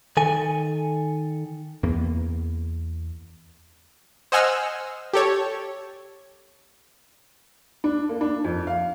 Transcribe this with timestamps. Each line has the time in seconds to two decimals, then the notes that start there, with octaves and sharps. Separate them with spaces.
0.17 D#3 A4 G#5
1.83 E2 A#3 B3
4.32 C5 D#5 F#5 G#5 E6 F6
5.13 G4 A4 C#5
7.84 D4
8.09 A#3
8.21 D4
8.44 F2
8.67 F5